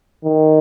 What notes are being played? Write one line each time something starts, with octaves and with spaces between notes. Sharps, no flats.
D#3